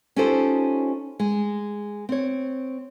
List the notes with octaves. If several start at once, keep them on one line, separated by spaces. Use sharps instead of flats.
C#4 D#4 F4 G4 A4 C5
G#3
C4 C#5